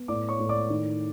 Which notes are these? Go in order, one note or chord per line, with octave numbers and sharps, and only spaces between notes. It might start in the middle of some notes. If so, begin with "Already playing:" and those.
Already playing: B3
A2 D5 D6
C#5 C#6
A2
D5 D6
D#3